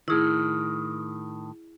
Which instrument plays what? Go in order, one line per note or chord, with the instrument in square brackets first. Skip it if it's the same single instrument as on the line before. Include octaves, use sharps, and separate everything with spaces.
[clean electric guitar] A2 D#3 [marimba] E4 G#4